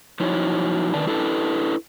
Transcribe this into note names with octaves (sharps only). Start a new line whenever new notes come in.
F3 F#3 D#4 E4 F#4 C#5
D3 D#3 B4 D5 A5
D4 E4 A4 B4 A5